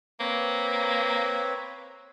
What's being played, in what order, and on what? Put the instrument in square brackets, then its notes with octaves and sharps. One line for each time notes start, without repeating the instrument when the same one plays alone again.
[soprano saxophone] A#3 [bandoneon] C4 B4 C#5